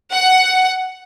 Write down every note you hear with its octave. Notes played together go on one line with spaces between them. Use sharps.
F#5